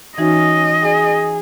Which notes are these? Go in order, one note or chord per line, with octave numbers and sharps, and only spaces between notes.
E3 C#4 D#4 F#4 D#5
G#4